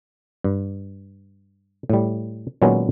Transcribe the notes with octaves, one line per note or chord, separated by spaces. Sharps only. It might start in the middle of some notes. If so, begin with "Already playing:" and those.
G2
A2 G3
A#2 D#3 F#3 G#3 B3 C#4